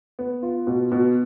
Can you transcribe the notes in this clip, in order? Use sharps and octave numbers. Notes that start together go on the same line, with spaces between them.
B3
F4
B2
B2